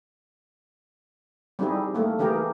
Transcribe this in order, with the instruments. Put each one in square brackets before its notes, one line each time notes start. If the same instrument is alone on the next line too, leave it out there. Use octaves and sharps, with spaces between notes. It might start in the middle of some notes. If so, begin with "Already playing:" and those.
[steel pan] G3 C4 D#4 E4 G#4
A3 A#3
E3 A3 G4 G#4 A#4